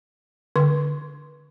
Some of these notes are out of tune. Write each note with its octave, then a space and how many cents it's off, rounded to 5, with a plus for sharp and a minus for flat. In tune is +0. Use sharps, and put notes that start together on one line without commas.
D3 +0 C#6 +20